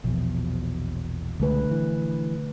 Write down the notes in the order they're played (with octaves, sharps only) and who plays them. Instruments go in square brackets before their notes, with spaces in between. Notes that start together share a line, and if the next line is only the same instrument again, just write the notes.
[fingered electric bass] A#1 E2 [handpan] B2 F3
[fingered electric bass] C#2 G#3 [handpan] D3 A3 B4
[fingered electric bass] E3